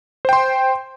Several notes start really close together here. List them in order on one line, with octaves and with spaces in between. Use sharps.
C5 G5 C6